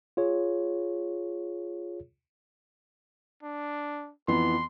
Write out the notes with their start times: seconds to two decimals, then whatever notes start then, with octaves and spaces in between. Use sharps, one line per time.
0.17 F4 G#4 C#5
3.43 D4
4.28 F2 E3 B3 C6